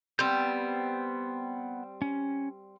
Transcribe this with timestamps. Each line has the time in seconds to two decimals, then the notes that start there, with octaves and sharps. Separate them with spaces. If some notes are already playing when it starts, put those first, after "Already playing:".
0.19 G3 B3 C4 E6 G6
2.02 C#4